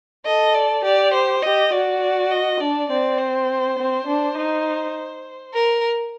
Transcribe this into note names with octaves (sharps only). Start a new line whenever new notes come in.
A4 D#5
D5
G4 D5
C5
G4 D#5
F#4 D5
D5
D#5
D4 D5
C4 D5
C5
C4
D4
D#4
A#4